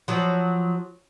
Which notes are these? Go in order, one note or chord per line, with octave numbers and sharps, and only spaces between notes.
F3 F#3